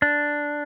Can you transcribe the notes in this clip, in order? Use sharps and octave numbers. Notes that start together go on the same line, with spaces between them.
D4